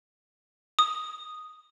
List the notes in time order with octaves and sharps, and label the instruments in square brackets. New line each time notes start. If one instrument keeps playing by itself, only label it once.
[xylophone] D#6